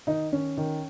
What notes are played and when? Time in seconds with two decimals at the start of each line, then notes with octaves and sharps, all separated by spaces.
0.07 D#3 D#4
0.32 D#3 C#4
0.57 D#3